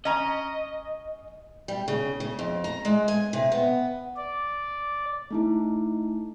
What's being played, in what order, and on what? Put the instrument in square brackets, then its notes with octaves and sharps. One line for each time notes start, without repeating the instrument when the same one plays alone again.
[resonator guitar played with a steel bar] C#4 A#5 [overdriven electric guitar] D#5
[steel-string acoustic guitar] G3
C#3
C#3
F2
A#5
G#3
G#5
C3
B3
[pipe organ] D5
[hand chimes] A3 D#4 E4